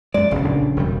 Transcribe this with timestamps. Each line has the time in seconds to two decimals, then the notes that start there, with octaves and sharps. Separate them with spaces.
0.14 F#2 G#3 D5
0.31 F#1 B1 C#3
0.44 A#1 A2 D4
0.77 E1 F2 G3